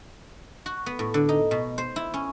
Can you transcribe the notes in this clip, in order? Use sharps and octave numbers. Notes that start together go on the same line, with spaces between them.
F#4
B3
A2
D3
D#4
B2
C5
E4
C#4